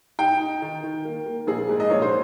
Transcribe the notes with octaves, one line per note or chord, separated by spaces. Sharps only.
D#4 G5
D#4
D#3
D#3
A#3
A#3
A#1 G#4
G#2
D#5
A#1 C#5
C5